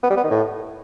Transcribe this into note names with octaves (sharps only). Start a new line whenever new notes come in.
B3
G3
B3
D#3
A2